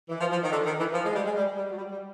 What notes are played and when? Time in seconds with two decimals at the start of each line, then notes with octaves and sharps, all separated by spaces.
0.09 E3
0.20 F3
0.31 F3
0.42 D#3
0.51 D3
0.66 D#3
0.80 E3
0.93 F3
1.04 G#3
1.14 G3
1.25 G#3
1.36 G3
1.57 G3
1.71 F#3
1.77 G3
1.92 G3